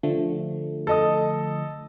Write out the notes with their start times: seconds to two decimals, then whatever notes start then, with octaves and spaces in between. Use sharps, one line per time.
0.03 D3 F3 A3
0.87 A4 D#5 D#6